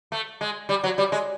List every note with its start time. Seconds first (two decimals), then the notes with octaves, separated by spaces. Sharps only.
0.12 A3
0.41 G#3
0.69 G3
0.84 F#3
0.98 G3
1.12 G#3